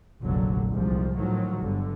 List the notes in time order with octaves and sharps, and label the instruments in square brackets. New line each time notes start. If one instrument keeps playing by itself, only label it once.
[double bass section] F1 A#1 A#2 D3 F#3
C2 G#2 F3
A2 D#3 F3 F#3
G1 G2 D3